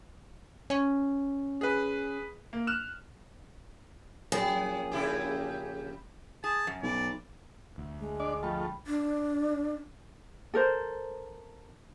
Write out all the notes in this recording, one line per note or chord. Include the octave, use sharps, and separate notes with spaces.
C#4
G#4 B4
A#3
F6 F#6 E7
A#1 F#3 A#3 C#4 G#4
C#3 E4 G4
G#4 A5
F#2
B1 D5
D2
G#3
D4 D5 D#5
F3 A3 G5 B5
D4
A4 A#4 C5